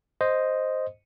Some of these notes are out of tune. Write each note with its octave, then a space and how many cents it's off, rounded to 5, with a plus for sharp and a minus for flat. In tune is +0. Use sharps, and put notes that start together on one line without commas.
C5 +0 D#5 +0